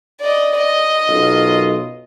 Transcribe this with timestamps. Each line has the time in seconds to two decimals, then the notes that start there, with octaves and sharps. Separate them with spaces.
0.21 D5 D#5
0.57 D#5
1.07 B1 F#2 F4